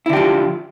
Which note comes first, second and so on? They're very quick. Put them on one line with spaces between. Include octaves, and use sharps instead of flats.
E4 D3 G4 F3